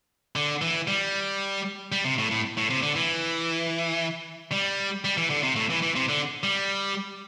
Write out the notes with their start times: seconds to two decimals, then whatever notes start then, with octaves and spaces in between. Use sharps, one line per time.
0.36 D3
0.62 E3
0.88 G3
1.92 G3
2.05 C3
2.18 A2
2.31 A2
2.57 A2
2.70 C3
2.83 D3
2.96 E3
4.52 G3
5.05 G3
5.17 E3
5.30 D3
5.43 C3
5.56 A2
5.70 E3
5.82 E3
5.96 C3
6.09 D3
6.43 G3